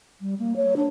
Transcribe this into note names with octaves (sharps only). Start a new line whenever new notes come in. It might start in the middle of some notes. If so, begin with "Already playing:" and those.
G3
A#3
C#5
D4